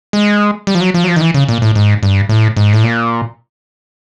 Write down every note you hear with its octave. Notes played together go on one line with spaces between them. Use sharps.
G#3
G3
F3
F#3
F3
F#3
F3
D#3
E3
C#3
A#2
A2
G#2
G2
A2
G#2
A2
A#2